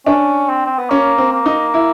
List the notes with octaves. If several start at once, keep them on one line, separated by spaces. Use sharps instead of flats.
C#4 D4
C4
C4
B3
A#3 C#4
C4
A#3
D#4
E4